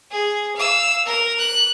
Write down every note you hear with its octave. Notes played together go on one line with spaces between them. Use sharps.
G#4
F5 E6
A#4
F#6